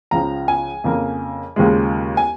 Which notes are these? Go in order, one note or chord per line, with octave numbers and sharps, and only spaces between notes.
C#2 C#3 F3 A#5
G#5
F2 C#3 A#3
D#2 C#3 F3 G#3
G#5